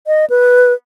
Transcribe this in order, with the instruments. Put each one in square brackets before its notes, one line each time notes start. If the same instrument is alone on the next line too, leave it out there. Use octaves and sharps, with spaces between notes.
[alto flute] D#5
B4